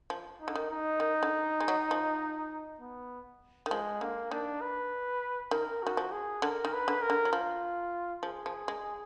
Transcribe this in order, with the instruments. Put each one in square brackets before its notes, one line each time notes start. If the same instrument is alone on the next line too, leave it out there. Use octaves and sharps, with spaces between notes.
[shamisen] F3
[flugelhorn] D#4
[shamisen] D3
D#3
[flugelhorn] D#4
[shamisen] D#3
D3
G#3
F#3
F3
[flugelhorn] B3
[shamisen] D#3
[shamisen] F3 [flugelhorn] G#3
[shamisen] D3 [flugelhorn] A#3
[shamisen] D#3 [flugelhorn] D4
[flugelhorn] B4
[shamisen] D#3 [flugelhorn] A#4
[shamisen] D#3 [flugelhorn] F#4
[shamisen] F3
[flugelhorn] G#4
[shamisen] D3 [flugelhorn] A#4
[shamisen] D#3
[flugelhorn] B4
[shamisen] D3
[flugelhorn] A#4
[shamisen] D3
F#3
[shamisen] F3 [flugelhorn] F4
[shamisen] F3 [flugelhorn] G#4
[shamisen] F3
G#3